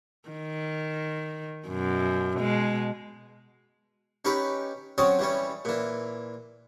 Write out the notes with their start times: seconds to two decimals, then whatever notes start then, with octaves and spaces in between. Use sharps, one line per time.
0.29 D#3
1.68 F#2 B2
2.36 B2 G#3
4.25 C#4 D#4 G4 B4
4.98 F#3 C4 C#4 C#5 C6 D#6
5.19 E3 G3 C#4
5.65 A#2 E3